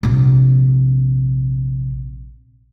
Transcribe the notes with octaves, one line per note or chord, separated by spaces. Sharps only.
A#1 C3